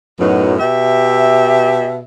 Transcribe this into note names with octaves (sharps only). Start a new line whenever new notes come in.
F#2 A2 F#3 B3 D#4
B2 G4 E5